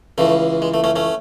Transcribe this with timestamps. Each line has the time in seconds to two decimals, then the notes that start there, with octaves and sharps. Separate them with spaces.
0.18 C#2 C#3 E3 A3
0.62 G#3
0.74 A3
0.84 A3 C#4
0.96 A3 C#4